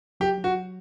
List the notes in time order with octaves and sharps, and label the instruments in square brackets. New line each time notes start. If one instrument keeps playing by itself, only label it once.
[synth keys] F#3 [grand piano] G4
[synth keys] F#3
[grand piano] F#4
[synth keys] F#3